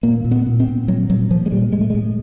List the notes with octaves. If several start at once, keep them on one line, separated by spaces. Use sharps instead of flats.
A#2 A#3
A#2
B3
A#2
C4
A#2
A#2 F#3
A#2 F#3
A#2 F3
G#3
A#2 G3
A2 G#3
A3
G#3
A2